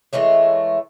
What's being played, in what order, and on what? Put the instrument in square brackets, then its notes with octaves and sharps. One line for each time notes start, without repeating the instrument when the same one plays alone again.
[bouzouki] E3 G#3 A3 C#5